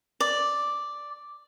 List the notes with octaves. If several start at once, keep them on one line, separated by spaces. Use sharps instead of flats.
D5